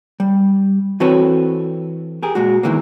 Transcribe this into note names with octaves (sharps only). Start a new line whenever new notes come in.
G3
E3 C4 F#4 A4 B4 C#5
G4 G#4 A#4
A#2 G#3 F#4
E2 G#2 D#3 E3 G#3 A#3